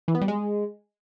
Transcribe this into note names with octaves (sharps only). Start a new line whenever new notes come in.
E3
B3
G3
G#3